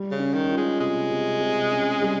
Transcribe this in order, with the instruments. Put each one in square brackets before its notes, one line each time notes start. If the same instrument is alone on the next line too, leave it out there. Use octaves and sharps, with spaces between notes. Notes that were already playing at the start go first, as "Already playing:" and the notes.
Already playing: [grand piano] G3
[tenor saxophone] C#3
[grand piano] C#4
[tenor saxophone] D#3
[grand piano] F4
[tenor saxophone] G#3
[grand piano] C3 [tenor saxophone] G#3
[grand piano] C3
C3
C#4
G3